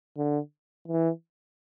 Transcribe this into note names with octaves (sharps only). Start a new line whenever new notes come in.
D3
E3